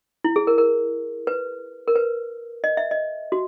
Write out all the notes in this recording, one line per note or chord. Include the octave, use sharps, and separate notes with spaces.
E4
G#4
A#4
A#4
B4
A#4
B4
D#5
E5
D#5
F#4